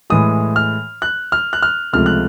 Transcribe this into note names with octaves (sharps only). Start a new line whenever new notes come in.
A2 E3 G#3 D#6
F6
F#6
F6
F#6
F6
C#2 C3 F3 A3 F6
F#6